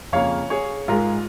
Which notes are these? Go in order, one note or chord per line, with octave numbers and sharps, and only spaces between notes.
F2 C#3 A#3 C#5 F5
G#4 C#5
G#2 G#3 F4 A#4